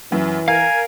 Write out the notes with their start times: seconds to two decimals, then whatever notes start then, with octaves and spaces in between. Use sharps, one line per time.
0.12 F#2 E3
0.48 A#4 F5 G#5